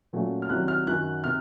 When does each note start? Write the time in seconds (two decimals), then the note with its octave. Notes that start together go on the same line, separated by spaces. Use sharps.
0.13 A#2 F#3 A3 C#4
0.42 F6
0.49 C2 C3 D#3 F#3 F#6
0.68 F6
0.86 F#2 D#3 F#3 F#6
1.24 C3 F6